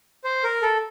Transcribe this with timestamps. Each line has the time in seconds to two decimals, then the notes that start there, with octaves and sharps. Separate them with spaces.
0.24 C5
0.44 A#4
0.62 A4